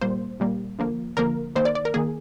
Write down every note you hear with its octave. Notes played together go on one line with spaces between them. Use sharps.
A#2 G3 A#3 C5
A#2 G3 A#3
D3 F3 A#3
D3 F3 A#3 A#4
D#3 A#3 C5
D5
D5
A#4
D#3 A#3 G#4